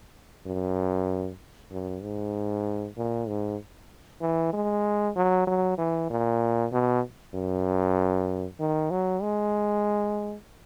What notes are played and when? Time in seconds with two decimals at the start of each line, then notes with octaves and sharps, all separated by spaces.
0.46 F#2
1.71 F#2
2.03 G#2
2.97 A#2
3.28 G#2
4.21 E3
4.53 G#3
5.16 F#3
5.47 F#3
5.78 E3
6.10 A#2
6.72 B2
7.34 F#2
8.60 D#3
8.91 F#3
9.22 G#3